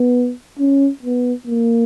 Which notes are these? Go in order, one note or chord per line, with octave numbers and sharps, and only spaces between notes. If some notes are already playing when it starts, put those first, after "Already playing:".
Already playing: B3
C#4
B3
A#3